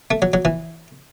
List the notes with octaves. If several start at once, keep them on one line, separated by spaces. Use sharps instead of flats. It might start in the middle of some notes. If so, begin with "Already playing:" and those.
A3
F#3
F#3
E3